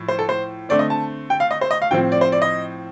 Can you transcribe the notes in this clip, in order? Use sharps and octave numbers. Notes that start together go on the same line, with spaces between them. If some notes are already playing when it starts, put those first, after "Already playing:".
Already playing: A2 F3
C5
A4
C5
D3 A3 C4 D5
D#5
A5
G5
F5
D#5
C5
D#5
F5
A2 F3 C4 G5
D5
C5
D5
D#5